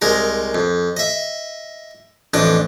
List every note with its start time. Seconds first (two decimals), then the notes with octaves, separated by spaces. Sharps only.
0.02 C2 G#3 A#4 A#5
0.54 F2
0.97 D#5 E5
2.34 A1 F2 D4 D#5 D#6